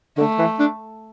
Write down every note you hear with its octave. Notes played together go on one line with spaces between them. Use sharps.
D3 A3
E3
D4